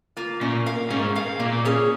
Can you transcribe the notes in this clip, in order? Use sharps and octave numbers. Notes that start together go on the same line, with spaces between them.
A#3 F4
A#2 C#4
A#4 F5
G#2 C#4
A#4 F5
A#2 A#3
C#4 G#4 C#5